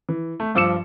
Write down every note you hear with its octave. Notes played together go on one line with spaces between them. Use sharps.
E3
A3
G2 F3 D6 E6 C#7 E7